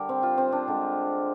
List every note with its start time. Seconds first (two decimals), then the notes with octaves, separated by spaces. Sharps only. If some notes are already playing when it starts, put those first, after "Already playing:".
Already playing: D3 G3 G4 A#4
0.09 C4
0.23 F4
0.38 C4
0.52 D4
0.68 D3 G#3